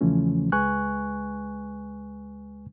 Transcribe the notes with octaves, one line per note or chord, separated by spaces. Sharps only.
E2 C#3 E3 F3 A3 C#4
C#2 G#3 B4 G#5 C#6 F#6